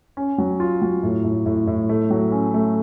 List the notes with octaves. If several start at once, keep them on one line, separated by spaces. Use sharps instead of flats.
C#4
F#3
F4
F#3
A2
A2
A2
A2
A3
F#3
C#4
A3